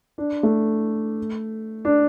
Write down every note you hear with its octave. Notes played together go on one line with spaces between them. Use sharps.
D4
A3
D4